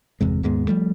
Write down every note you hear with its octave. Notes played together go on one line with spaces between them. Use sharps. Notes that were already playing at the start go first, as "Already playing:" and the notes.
G1 E2 C3 G#3
D#2 G#2 G#3 B3
F3 G3 A3